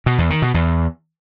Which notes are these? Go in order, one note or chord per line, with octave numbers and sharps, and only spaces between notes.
B2
E2
D#3
B2
E2